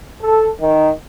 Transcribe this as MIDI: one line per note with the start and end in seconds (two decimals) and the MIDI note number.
0.21 0.48 69
0.61 0.90 51